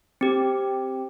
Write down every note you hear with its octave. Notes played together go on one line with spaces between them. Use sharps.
C4 G4